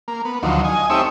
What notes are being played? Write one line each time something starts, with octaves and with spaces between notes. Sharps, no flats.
A#3
B3
D2 D#3 F3 F#3
D#5 G#5
A3 C4 D#4 G4 C#5 E5